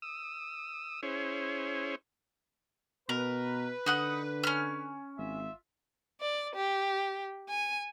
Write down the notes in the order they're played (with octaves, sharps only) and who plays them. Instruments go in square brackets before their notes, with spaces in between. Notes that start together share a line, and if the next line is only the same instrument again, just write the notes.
[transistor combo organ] D#6 E6
C#4 E4 G#4 C5 C#5
[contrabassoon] B2 [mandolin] A#4 [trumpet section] B4
[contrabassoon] D3 [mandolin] D#4 F#5 D#6
[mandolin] C#4 F6
[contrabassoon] G#1 [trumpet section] F4 E5
[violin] D5
G4
G#5